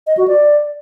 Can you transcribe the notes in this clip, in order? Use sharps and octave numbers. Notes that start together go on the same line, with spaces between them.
D#5
F#4
D5